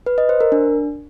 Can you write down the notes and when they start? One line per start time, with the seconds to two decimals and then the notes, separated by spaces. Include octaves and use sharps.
0.06 B4
0.18 D#5
0.29 C5
0.41 A#4
0.52 D4